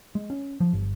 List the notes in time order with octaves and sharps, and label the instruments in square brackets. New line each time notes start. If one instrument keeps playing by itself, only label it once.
[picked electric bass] G#3
C#4
F3
G1